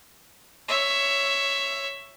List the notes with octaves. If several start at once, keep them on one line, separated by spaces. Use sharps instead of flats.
C#5 E5